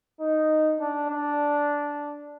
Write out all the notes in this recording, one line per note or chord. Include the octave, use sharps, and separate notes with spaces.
D#4
D4
D4